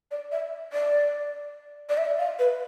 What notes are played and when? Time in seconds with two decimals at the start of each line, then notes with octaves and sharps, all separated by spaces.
0.11 D5
0.32 E5
0.73 D5
1.89 D5
1.98 E5
2.18 F5
2.39 B4